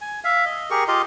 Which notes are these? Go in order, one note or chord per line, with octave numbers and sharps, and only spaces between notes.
G#5
E5 F5
D#5
G4 G#4 A#4 C#6
F4 G4 D#5 F5